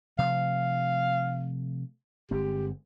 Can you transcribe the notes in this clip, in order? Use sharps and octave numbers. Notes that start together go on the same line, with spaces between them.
C3 F3 A3 F5
G1 G#3 C4 G4